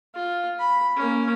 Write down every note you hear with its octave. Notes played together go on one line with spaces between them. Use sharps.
F4
B5
A#3 C#4